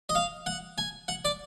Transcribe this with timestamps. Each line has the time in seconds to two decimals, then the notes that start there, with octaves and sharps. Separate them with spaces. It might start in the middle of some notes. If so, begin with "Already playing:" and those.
0.09 D#5
0.15 F5
0.46 F#5
0.78 G#5
1.08 F#5
1.25 D5